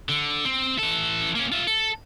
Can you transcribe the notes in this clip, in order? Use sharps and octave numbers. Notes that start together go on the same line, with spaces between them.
D3
C4
E3 A4
A#3 C#4
F4 E5
A4